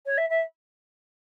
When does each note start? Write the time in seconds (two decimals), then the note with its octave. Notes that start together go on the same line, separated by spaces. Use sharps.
0.06 C#5
0.17 E5
0.30 E5